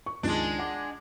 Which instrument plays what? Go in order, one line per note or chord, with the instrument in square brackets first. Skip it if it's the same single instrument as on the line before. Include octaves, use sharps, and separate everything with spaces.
[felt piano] C#6
[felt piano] C#2 D#3 [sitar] G#3 D4
[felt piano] F#5 D6